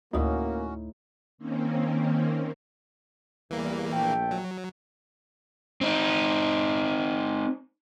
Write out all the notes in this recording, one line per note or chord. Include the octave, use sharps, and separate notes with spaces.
D2 A2 A#3 C#4 D#4 F#4
D#3 A#3 C4 C#4
E2 E3 G3 A#3
A#1 A3 G5
F#3
C4 D#4